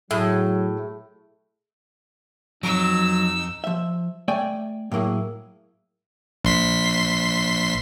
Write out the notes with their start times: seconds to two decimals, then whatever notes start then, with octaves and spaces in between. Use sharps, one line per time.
0.11 A2 F#3 G#4 E5
2.63 F2 F#3 D#4 E6
3.64 F3 E5
4.28 A3 D5 G5 G#5
4.92 A2 F#3 A#3 E4 G#4
6.44 A#1 C6 B6